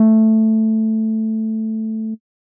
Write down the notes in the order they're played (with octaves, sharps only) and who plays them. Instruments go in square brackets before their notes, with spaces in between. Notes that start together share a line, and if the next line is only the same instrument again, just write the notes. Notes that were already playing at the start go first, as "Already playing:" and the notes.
Already playing: [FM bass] A3